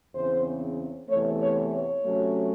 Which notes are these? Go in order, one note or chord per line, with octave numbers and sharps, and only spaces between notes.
E2 C#3 E3 C4 C5
E2 C3 E3 A3 C#5
C#5
C#5
C3 F#3 A3 C#4